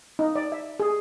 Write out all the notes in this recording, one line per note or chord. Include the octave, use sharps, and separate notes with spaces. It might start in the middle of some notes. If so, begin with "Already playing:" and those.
D#4
D5
E5
G#4